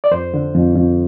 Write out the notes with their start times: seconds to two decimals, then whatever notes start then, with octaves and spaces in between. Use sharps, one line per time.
0.04 D5
0.11 F2 C5
0.34 D3
0.55 F2
0.75 F2